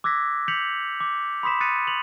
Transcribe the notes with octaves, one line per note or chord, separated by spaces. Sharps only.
D6 E6 F#6 G#6 A#6 B6
G6 G#6 B6 C#7 F7 F#7
D6
B5 C6 D#6 B6 E7
D#6 F#6 A6 B6 C#7 D#7
F7 F#7